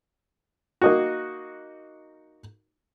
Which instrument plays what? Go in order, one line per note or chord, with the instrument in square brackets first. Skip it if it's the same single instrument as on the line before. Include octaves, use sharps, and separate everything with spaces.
[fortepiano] A#3 D#4 F#4